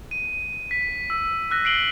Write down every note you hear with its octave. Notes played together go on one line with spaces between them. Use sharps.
D#7
B6
E6
E6 F#6 A#6
C7 D7 F#7 G7